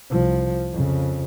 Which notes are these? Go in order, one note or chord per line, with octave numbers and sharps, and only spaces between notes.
C2 F3
F2 C#3